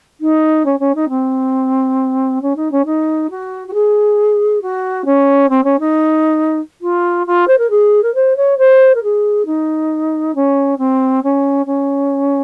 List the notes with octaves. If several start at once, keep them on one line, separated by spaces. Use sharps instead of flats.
D#4
C#4
C#4
D#4
C4
C#4
D#4
C#4
D#4
F#4
F#4
G#4
F#4
C#4
C4
C#4
D#4
F4
F4
C5
A#4
G#4
A#4
C5
C#5
C5
A#4
G#4
D#4
C#4
C4
C#4
C#4